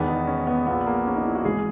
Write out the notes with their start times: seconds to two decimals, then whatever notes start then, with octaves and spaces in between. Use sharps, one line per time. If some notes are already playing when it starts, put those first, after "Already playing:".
Already playing: E1 E2 D#3 B3
0.08 D#4
0.27 C#4
0.47 B3
0.67 A#1 A#2 B3
0.86 A#3
1.06 C#4
1.16 D#4
1.25 E4
1.35 F#4
1.45 G#1 G#2 E3 G#4